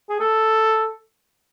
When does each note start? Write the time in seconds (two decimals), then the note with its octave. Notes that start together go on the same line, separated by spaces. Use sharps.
0.09 G#4
0.20 A4